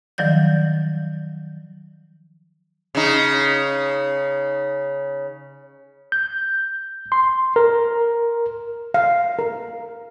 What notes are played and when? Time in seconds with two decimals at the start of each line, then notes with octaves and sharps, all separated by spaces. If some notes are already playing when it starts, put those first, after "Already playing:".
0.18 D#3 F3 F#3 D5 G6
2.95 C#3 D#4
6.12 G6
7.12 C6
7.56 A#4
8.94 F5
9.39 A#4